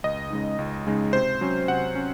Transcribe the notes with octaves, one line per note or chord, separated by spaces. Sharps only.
C#2 D#5
C#3 G#3 D#4
C#2
C#3 G#3 D#4
C3 C5
F#3 C#4
C3 F#5
C#4